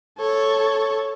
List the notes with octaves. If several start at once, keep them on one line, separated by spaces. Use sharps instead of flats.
A4 C#5